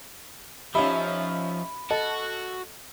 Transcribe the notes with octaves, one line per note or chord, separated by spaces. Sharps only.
F3 C#4 D#4 G4 E5 F5 B5
F#4 A4 D#5 A5